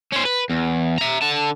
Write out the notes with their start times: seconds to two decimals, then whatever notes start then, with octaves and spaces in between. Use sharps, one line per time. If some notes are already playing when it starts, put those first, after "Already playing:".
0.13 C#4 C5
0.25 B4
0.50 E2
0.98 E5 A#5
1.22 D3 A5